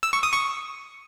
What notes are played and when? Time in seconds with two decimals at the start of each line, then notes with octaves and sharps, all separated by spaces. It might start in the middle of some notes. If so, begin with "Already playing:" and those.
0.03 E6
0.13 C#6
0.23 D#6
0.33 C#6